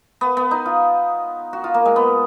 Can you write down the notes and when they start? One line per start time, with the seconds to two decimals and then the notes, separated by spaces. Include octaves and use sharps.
0.21 B3
0.37 B3
0.51 D#4
0.66 F4
1.53 F#4
1.64 F4
1.74 A#3
1.85 G#3
1.96 B3